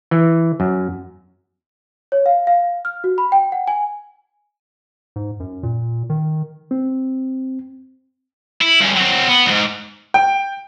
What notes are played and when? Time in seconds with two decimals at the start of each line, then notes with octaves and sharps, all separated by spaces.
0.11 E3
0.60 F#2
2.12 C#5
2.26 F5
2.47 F5
2.85 F6
3.04 F#4
3.18 B5
3.32 G5
3.52 F#5
3.68 G#5
5.16 G#2
5.40 F#2
5.63 A#2
6.10 D#3
6.71 C4
8.62 E4
8.81 G2 C#4
8.97 F#3 C4
9.28 B3
9.46 D2 G#2
10.14 G5